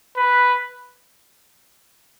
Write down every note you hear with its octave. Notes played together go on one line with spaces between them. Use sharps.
B4